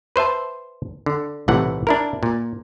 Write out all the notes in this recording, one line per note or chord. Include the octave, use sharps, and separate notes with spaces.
B4 C5 E5 A5
D3
B1 A2 C3 E3 F#5
D4 E4 A#4
A#2